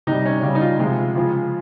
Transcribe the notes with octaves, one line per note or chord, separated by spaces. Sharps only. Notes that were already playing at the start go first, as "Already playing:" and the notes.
C3 G3 D#4
C#4
C#3 G3
D#4
F4
C3 F3 G#3
C#3 F3 G#3